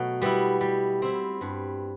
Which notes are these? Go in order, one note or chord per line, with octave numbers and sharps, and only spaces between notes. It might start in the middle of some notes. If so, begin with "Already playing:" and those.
Already playing: B2 F#3 A3
G3 B3 E4
G3
C4 E4
G2